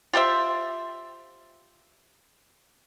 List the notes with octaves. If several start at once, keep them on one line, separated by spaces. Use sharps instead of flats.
F4 G4 C5 E5